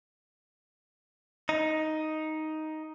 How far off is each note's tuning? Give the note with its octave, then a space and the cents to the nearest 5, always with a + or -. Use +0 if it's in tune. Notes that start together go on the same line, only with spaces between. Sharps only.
D#4 +5